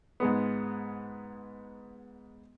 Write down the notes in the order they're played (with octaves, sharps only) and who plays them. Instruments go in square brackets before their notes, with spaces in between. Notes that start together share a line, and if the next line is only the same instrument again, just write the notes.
[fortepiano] G#2 G#3 B3